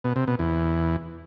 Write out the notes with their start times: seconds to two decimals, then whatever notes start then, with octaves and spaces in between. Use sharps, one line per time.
0.04 B2
0.16 C3
0.28 B2
0.39 E2